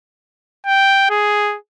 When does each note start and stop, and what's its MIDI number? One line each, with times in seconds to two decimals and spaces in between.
0.66 1.07 79
1.10 1.57 68